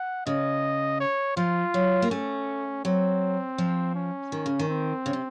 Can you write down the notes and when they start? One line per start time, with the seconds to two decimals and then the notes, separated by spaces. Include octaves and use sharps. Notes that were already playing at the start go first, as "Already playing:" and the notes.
Already playing: F#5
0.26 C#3 D#5
1.01 C#5
1.37 F3 F4
1.74 F#3
2.02 A#3
2.11 A3 C#4
2.85 F#3 C4
3.58 F3
3.95 C#4
4.32 D#3
4.46 C#3
4.59 D#3
4.69 C4
5.06 C#3
5.13 C3